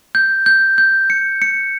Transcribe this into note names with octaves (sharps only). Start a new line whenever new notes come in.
G6
G6
G6
C#7
C#7